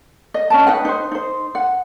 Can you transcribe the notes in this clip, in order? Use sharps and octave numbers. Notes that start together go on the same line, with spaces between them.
D#5
C#4 D#5 A5
D#4 B4 G5
D#4 C5
D#4 C5
F#5